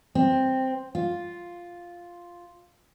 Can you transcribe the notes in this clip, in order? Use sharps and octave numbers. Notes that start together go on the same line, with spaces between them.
C4
F4